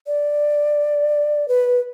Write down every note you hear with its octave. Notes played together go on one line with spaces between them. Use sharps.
D5
B4